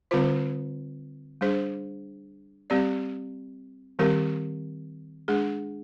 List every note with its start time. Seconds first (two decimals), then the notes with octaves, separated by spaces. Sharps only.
0.11 D3 G3 C4 F4 C5
1.41 G3 D4 G#4 C5
2.70 G3 C4 G4 D5
3.99 D#3 G3 C4 G4 A#4
5.28 G#3 D4 G#4